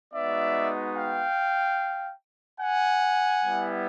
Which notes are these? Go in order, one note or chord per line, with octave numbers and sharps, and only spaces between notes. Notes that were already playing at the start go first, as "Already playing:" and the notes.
G#3 B3 D#4 F#4 D5 E5
F5 G5
F#5 G#5
G3 B3 E4